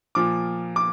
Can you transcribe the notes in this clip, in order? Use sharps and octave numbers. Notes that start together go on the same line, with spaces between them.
A#2 F3 D6
D6